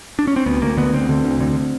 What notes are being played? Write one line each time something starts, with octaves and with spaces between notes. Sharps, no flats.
D4
C#4
C4
D2 B3
D2 A#3
D3 B3
D2 C4
D3
D2
D3